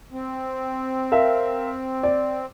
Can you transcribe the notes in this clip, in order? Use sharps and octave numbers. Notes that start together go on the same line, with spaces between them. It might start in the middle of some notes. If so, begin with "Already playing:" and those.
C4
A#4 E5 F5
D5